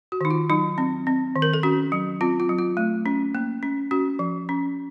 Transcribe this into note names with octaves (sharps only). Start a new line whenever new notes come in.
F#4
D#3 D#4
F4
F#3 D#4
C4
C4
D#3
A#4
A4
C#4 F#4
F#3
C4 F4
F4
F#3
F4
A3
C#4
A#3
C#4
C#4 F#4
F3
C#4